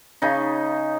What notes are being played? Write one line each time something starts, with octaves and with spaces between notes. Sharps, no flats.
C#3 D#4